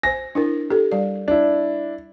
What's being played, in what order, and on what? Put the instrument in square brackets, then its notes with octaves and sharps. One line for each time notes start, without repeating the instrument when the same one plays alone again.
[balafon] C5 G#5 [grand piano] A#6
[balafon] D4 E4 A#4
G4 A4
G3 D5
[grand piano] D4 E4